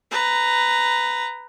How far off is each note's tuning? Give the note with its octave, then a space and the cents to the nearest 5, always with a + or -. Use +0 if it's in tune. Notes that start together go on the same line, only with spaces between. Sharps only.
B4 +15 A#5 +0